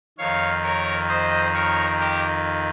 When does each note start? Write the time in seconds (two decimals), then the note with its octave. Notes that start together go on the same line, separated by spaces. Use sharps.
0.18 F2 D#3 C#5 F5
0.63 A#4 C#5
1.09 C5 D#5
1.54 A#4 C#5
1.99 G4 A#4